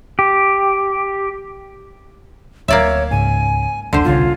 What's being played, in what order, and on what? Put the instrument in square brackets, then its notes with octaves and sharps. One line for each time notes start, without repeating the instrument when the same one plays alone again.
[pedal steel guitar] G4
[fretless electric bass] D1 [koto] A#3 D5 E5 [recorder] C#5
[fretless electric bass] C#2 G#2 [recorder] G#5
[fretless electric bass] F#1 D2 [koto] D3 C5
[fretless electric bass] D#1 B1 C#3 [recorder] F4